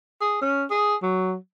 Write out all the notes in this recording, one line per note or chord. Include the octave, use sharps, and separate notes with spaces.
G#4
C#4
G#4
F#3